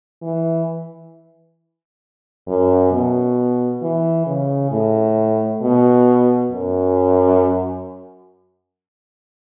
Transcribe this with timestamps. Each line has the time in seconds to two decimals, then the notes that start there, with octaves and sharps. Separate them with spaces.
0.22 E3
2.47 F#2
2.92 B2
3.82 E3
4.27 C#3
4.71 A2
5.61 B2
6.52 F#2